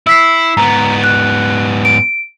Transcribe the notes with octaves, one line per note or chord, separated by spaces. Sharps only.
E4 E6 B6 C7
G#2 B3 A#5
F#6
D7